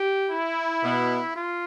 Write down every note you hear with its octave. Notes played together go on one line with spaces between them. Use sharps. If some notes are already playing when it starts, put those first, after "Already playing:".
Already playing: G4
E4
B2 B3
F4